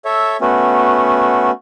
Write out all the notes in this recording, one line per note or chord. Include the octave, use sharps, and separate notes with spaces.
A4 C#5 E5
A3 B3 C#4 F#4